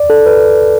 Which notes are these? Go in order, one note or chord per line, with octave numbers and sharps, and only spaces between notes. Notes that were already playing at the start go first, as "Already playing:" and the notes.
Already playing: D5
A4
B4